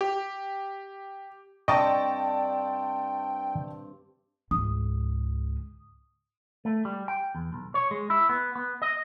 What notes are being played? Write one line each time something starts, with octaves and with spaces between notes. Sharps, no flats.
G4
G2 C4 D5 D#5 F5 G5 A5 C#6
C#2 G#2 D#6
A3
G3
G5
E2
B1
C#5
G#3
E4
B3
B3
D#5